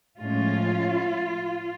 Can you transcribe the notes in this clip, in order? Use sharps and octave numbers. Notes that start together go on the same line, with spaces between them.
A2 F3 G#3 C#4 F4